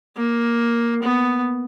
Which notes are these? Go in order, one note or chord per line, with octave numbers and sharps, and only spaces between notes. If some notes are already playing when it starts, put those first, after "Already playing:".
A#3
B3